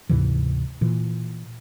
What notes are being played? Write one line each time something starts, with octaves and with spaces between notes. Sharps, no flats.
D2 G#2 C3 E3
A#2 E3